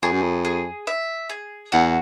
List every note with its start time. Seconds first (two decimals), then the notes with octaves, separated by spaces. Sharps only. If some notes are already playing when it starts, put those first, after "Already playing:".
0.02 F2 G#4
0.12 F#2
0.22 F2
0.45 G#4
0.87 E5
1.30 G#4
1.72 E2 F#4